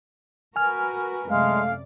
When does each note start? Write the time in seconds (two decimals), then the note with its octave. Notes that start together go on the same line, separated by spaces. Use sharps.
0.56 F#4 A#4 B4 G#5 F6
1.30 F#2 C3 G#3 A3 D5 F5